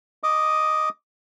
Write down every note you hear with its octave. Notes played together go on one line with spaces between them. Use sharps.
D#5 D6 D#6